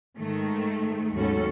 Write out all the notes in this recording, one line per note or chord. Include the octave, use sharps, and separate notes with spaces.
G#2 D#3 A3
D#2 G#2 F#3 C#4 F#4 A4